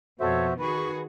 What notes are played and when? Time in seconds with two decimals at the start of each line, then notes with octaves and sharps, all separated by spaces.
0.20 F2 B2 F3 F#4 A4 C5 C#5 E5
0.59 D#3 F#4 G#4 B4 B5 C#6